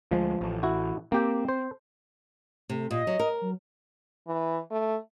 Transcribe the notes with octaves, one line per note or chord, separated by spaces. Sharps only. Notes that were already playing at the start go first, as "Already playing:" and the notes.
D2 F3 G#3
A1
E4 F#4
A#3 C4 G4 G5
C5
C3 A3
A#2 D#5
F#3
A#4
F#3
E3
A3